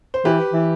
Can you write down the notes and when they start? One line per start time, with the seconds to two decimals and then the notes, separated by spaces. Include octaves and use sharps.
0.14 C5
0.25 E3 G4 B4
0.53 E3